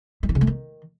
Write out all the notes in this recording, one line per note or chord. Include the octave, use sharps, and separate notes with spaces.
G3
E3
C#3
A3
D#3